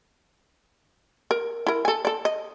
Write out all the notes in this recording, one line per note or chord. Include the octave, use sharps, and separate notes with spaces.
A#4
E4 A#4
A4 G#5
A4 D5
D#5